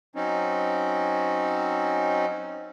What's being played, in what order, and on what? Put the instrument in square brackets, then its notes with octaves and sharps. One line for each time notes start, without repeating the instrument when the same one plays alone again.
[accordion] F#3 C4 C#4 D#4